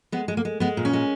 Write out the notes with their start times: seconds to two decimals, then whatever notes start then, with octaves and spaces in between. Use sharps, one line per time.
0.12 G#3 B3
0.28 G#3
0.37 A#3
0.45 G#3
0.60 G#3 B3
0.77 A#2
0.85 C#4
0.93 G#3